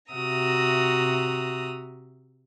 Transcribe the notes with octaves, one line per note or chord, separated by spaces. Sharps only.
C3 F#4 E5 A#5 D#6